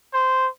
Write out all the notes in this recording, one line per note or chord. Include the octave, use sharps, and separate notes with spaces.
C5